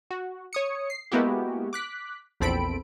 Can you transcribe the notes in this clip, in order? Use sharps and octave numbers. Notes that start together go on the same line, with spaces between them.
F#4
C#5 D#6 C#7
C7
G#3 A#3 B3 E4 F#4 G4
D6 F#6 B6
A#1 E2 C4 A4 B5 D7